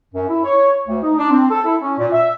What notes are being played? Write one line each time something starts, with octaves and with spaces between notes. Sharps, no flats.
F#2
E4
C#5
D2
D#4
D4
C4
A4
E4
C#4
A#2
E5